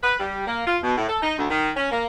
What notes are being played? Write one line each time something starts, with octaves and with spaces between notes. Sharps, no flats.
B4
G3
A#3
F4
B2
A2
A4
D#4
D2
D#3
C#4
A#3